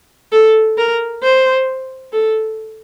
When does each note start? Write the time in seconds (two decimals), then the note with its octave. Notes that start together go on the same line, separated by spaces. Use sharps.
0.32 A4
0.78 A#4
1.23 C5
2.12 A4